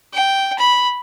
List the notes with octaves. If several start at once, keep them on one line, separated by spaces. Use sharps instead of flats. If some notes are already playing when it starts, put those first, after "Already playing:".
G5
B5